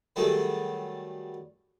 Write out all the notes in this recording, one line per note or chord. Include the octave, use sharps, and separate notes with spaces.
D#3 F#3 G3 A3 G#4